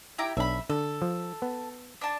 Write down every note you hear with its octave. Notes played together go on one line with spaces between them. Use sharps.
E4 G4 A#5
B1 D4 E5 B5
D3 A4
F3
B3
D4 A5